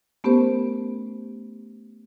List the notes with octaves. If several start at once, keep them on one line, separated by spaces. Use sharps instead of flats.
A3 B3 C#4 G4 A#4 C5